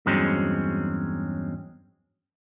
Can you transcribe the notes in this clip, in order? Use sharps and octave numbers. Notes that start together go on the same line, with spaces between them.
E2 G2 F#3 G#3 C4 C#4